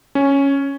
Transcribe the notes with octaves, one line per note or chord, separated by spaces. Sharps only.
C#4